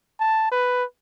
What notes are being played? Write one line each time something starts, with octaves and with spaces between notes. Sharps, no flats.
A5
B4